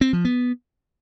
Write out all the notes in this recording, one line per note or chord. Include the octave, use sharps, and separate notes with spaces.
C4
F3
B3